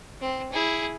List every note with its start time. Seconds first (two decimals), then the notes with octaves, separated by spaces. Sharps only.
0.21 C4
0.52 E4 G#4